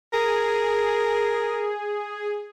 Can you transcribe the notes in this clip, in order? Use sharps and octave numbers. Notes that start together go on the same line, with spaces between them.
G#4 A#4